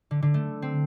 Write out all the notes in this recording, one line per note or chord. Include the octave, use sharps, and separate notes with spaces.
D3
D3
A3
C4